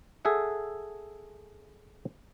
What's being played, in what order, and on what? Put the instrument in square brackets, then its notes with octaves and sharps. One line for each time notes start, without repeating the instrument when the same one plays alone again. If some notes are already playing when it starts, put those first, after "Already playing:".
[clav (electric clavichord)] G#4 A4 E5 F#5